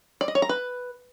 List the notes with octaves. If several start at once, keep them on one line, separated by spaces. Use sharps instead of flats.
D5
D#5
C#5
A#5
B4